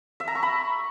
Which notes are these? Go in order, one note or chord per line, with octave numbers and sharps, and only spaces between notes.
E5
A#5
C#6
B5